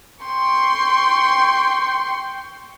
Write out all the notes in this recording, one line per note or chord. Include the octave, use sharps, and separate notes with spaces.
G5 C6 C#6